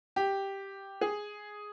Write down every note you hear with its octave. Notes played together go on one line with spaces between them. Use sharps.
G4
G#4